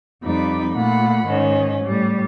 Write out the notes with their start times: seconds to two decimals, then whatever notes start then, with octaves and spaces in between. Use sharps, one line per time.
0.22 F2 G3 D#4 B5 D6
0.74 A#2 A3 F#5 B5
1.27 G#2 D#3 C#4
1.84 A2 G3